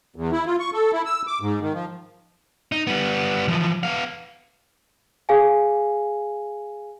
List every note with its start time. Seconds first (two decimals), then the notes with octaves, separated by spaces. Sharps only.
0.16 E2
0.32 E4
0.46 F4
0.59 C#6
0.73 A4
0.93 E4
1.06 E6
1.27 D6
1.41 G#2
1.61 D#3
1.73 F3
2.72 D#4
2.87 G3 B3
3.48 E3 F3
3.83 B3 F5
5.29 G#4 F5 G#5